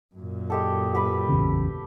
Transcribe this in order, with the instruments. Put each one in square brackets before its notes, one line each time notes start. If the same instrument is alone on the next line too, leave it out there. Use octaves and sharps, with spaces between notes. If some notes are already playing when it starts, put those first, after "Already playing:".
[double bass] F#2 A#2
[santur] G#3 G4 A4
G4 B4 B5
[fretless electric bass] A1 E2 C#3